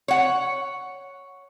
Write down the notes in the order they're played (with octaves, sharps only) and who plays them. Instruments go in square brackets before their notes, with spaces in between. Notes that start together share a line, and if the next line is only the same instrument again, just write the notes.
[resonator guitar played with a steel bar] C#5 F#5